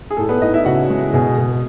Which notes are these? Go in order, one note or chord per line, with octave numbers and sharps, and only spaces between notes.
G#4
A2 A4
B3 B4
A2 D#4 D#5
E4 E5
C#3 F#4 F#5
G#3
B2 G#4
B2